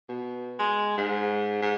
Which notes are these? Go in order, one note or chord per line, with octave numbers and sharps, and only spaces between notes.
B2
G#3
G#2
G#2